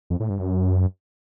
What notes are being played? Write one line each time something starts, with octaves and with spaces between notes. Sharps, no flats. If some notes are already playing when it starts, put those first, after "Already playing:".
F2
A2
G2
F#2